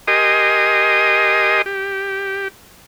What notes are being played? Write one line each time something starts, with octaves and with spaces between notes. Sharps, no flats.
G4 A#4 D#5 G#5 C6 D#6
G4